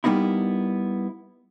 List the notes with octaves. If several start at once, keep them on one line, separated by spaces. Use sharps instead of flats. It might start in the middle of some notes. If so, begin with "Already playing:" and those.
G3 A#3 B3 D#4 E4